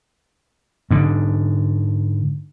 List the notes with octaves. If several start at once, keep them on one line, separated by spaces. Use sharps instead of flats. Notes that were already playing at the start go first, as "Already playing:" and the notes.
G#2 D3